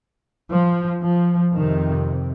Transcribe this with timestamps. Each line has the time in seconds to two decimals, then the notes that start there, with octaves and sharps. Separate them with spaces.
0.50 F3
1.03 F3
1.54 F2 C3 D#3